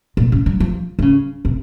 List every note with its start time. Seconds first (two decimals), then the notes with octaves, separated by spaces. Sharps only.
0.17 A#2
0.32 C#3
0.46 F#3
0.60 F3
0.99 D3
1.02 C#3
1.45 C3